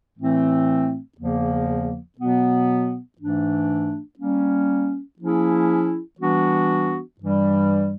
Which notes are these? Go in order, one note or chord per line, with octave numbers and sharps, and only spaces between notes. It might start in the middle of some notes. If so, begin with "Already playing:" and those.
A2 E3 A3 C4
E2 C#3 F3 A#3
B2 F#3 B3
G#2 E3 A3 D4
G3 A#3 C#4
F3 A#3 C#4 E4 G#4
E3 G3 B3 D4 F#4
G2 E3 G3